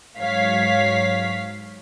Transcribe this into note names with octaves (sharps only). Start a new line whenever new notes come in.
G#2 F#3 C#5 F5 B6